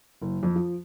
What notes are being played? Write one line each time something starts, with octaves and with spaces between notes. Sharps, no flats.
F#1
F2
F3